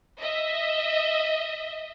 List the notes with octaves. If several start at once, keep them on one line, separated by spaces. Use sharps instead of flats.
D#5 E5